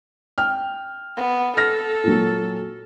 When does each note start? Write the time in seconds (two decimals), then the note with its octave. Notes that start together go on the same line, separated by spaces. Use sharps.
0.38 G5 F6
1.17 B3
1.57 A4 F6 A#6
2.04 A#2 F#3